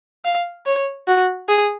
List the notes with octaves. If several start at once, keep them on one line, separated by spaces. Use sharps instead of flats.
F5
C#5
F#4
G#4